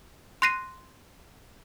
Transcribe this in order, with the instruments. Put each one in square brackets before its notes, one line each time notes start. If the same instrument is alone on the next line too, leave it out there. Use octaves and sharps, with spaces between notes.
[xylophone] C6 F#6 A#6 C7 D#7